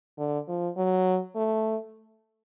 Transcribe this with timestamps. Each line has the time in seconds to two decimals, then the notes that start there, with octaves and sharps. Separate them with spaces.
0.18 D3
0.48 F3
0.77 F#3
1.36 A3